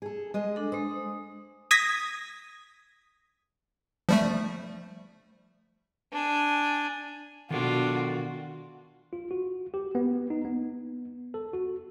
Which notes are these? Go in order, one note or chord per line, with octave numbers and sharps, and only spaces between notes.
G#4 A4
G#3 D#5
D4 A4
G#3 C5 D#6
D#6 G#6 A#6 B6
F3 G3 A3
D4 G#5
B2 D#3 D4 F4 F#4 A4 A#4
F4
F#4
G4
B3
D#4
B3
A4
F#4